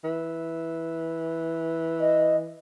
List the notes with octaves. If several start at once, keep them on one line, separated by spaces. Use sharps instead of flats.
E3
D#5